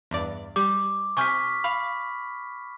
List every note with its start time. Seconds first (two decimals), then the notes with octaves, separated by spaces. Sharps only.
0.11 E2 G2 D5
0.56 G3 G4 D6
1.17 C3 G#5 C#6 F6 G6 B6
1.64 F5 B5